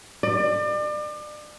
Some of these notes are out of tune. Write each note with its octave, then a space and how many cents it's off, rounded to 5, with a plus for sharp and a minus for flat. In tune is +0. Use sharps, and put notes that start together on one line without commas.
D5 +35